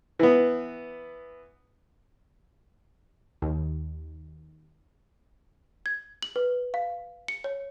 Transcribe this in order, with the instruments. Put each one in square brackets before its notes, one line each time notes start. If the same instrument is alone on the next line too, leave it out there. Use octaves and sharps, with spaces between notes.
[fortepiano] E3 B3
[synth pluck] D#2
[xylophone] G#6
F#7
B4
F5
C#7
C#5